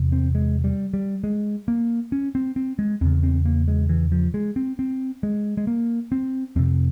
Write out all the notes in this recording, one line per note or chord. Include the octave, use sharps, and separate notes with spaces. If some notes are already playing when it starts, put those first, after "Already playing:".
Already playing: E2 C3
C4
G#3
G3
G3
G#3
A#3
C#4
C4
C4
G#3
E2 C#3 C4
C4
A#3
G#3
E3
F3
G#3
C4
C4
G#3
G#3
A#3
C4
F2 C3 C4